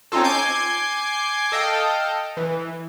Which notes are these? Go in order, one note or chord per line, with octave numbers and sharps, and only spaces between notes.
C4 C#4 D#4 F4 A4
G#5 D6 G6 G#6 C7
A4 D#5 F5 G5
E3